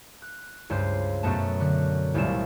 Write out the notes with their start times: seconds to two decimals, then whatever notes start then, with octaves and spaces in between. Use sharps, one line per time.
0.22 F#6
0.70 C#2 G2 C5
1.23 F#2 B2 A3 B3 A5
1.60 D3 F#6
2.14 D#1 C2 A#2 A3 F4 E7